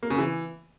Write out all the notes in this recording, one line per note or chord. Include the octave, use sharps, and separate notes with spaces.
A#3
C#3
E3